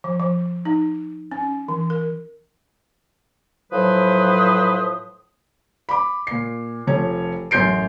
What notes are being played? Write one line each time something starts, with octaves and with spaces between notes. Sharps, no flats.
F3
F3
D#4
C#4
E3
A#4
A2 F3 F#3 B4 C5 D#6
B5 D6
A#2 C7
F1 F3 C#5
A1 F#2 C6 G6 C7 D7